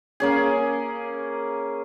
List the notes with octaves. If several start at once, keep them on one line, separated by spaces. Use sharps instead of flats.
A#3 C#4 G#4